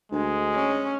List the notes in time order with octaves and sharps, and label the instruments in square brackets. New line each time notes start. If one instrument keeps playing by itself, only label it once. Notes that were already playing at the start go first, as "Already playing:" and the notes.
[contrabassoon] D2 [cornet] G#3
[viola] C#4